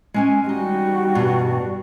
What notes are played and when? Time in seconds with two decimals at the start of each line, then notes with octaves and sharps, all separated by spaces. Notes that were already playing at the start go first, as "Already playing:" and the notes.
0.14 G#3 C#4 G#5
0.49 G3 D#4 F#4
1.15 E2 G2 B2